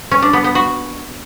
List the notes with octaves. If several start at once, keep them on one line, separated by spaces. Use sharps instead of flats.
C#4
D4
B3
B3
F#4